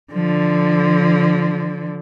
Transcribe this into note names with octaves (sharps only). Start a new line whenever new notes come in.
D3 F3